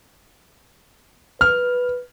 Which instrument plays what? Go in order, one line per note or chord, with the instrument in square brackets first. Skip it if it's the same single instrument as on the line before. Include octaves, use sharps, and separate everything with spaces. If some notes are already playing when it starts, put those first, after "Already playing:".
[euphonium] B4 [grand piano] F6